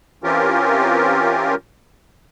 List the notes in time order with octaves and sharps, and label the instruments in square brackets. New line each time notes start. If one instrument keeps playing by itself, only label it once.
[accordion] E3 C4 C#4 F4 G4 A#4